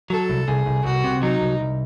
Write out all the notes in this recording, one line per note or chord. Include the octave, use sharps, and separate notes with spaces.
F#3 A4
C2
C2 G#4
C2
C2 F#4
C3
F#3 D#4
C2
C2